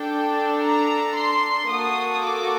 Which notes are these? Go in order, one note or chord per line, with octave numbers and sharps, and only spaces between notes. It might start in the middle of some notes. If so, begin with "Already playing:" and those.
Already playing: D4 A4 G5
A#5
C6
A#3 F#4 A4 D#6
D6